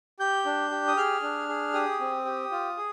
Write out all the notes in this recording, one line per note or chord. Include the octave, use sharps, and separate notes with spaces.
G4 G6
D4
G4
D#6
G#4 F6
D4
G#4
G4 D#6
C4
G4
F4
G#4